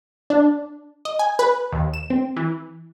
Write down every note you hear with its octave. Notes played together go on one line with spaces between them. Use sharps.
D4
D#5
G#5
B4
D#2
E7
C4
E3